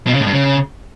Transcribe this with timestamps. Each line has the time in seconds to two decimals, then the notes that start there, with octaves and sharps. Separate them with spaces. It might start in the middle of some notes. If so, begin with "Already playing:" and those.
0.07 B2
0.13 C#3
0.20 A2
0.26 G2
0.33 C#3